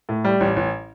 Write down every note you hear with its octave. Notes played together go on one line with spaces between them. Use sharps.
A2
G3
A1
A1